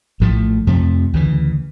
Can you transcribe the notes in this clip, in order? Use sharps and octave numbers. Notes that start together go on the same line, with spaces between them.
A#1 A2 F3 A3
F2 C3 F3 A3
D2 C#3 E3